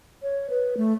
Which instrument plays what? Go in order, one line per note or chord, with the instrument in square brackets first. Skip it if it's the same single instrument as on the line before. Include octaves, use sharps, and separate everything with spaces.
[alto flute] C#5
B4
A3